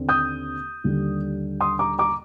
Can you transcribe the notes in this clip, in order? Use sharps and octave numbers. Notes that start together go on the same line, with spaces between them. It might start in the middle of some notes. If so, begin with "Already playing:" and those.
Already playing: D#2 D3 C4
D#6 G6
D#2 D3 G3
C6 D#6
A#5 D6
A#5 D6